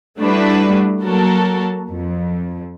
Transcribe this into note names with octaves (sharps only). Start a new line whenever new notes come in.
G3 A3 D4 E4 F#4 B4
F#3 A#3 F#4 A4 A#4
F2